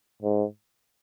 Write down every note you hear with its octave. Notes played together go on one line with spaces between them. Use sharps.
G#2